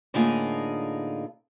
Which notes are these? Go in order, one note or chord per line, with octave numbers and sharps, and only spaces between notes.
A2 D3 A#3 D#4 F4 G#4